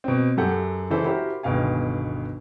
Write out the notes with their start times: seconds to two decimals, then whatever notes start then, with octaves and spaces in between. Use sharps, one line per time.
0.04 B2 C4
0.37 F#2 G4 A4 F#5 G6
0.90 C#3 E3 E4 A4 C5
1.04 E4 F#4 G4 A#4 C5
1.43 G1 C#2 B2 D#3 F5 G#5